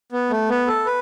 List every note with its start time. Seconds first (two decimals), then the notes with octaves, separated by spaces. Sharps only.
0.12 B3
0.30 A3
0.49 B3
0.68 A4
0.86 B4